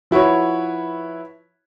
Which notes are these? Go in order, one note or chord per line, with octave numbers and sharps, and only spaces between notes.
F3 E4 F#4 B4 C#5